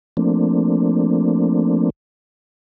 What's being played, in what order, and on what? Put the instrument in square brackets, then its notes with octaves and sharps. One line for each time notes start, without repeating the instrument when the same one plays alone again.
[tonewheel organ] F3 A3 A#3 C4 D4